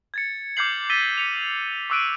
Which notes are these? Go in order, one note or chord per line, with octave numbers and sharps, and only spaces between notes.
G#6 A6 C#7
D6 F6 G6 G#6 C7 F#7
E6 A6 B6 D#7 G7
B6 C#7 F7
C#6 D6 E6 F#6 D7 D#7